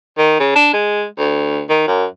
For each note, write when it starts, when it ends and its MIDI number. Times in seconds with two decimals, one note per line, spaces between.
0.18 0.35 51
0.40 0.55 49
0.55 0.70 62
0.73 1.05 56
1.18 1.63 38
1.69 1.84 51
1.87 2.05 42